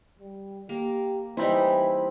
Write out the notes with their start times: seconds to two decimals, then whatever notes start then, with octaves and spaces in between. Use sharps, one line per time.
0.19 G3
0.69 A#3 G4
1.37 E3 G3 C4 D#4 E4 B5